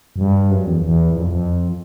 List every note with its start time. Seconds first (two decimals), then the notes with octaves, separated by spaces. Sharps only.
0.16 F#2
0.21 G2
0.51 F#2
0.66 E2
0.82 E2
1.12 F2
1.27 F2